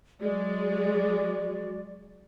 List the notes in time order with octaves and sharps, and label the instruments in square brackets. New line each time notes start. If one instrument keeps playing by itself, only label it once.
[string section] F#3 G#3 [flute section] F#4 D5